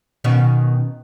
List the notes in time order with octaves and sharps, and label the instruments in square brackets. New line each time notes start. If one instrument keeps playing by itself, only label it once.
[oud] B2 D#3 C#4